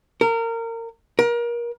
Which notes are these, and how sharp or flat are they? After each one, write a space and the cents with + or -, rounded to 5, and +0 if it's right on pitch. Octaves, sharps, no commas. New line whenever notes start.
A#4 -25
A#4 +30